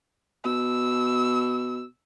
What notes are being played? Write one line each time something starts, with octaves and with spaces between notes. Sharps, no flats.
B2 E6